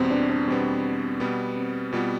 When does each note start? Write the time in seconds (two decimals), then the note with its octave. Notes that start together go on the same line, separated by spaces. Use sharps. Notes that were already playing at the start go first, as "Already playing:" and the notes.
Already playing: E2 B2 G3 B3 C4
0.11 D4
0.30 D4
0.48 E2 B2 G3 B3 C4
1.20 B2 G3 B3
1.56 C4
1.93 B2 G3 B3 F4